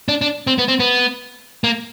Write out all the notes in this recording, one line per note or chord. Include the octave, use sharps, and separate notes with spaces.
D4
D4
C4
B3
C4
B3
A#3